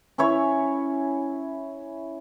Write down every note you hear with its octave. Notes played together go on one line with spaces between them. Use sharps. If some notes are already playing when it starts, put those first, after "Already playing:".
C#4 E4 C#5